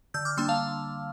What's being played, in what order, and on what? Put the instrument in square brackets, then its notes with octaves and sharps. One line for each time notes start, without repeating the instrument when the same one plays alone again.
[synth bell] D3 E6 G6
D6 F6
G3 A#3 D4 C6 E6
F5 A5